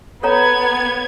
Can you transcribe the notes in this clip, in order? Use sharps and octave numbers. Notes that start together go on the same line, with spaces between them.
B3 A4 C#5 A#5 G#6